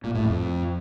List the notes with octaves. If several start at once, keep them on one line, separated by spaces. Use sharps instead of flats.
A#2
A2
F2